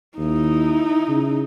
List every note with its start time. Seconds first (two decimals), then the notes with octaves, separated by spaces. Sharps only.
0.18 D#2 D#4 E4
1.08 C#3